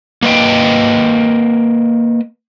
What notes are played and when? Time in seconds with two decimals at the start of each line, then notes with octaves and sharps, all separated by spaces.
0.23 A#3 B4 D#5 G5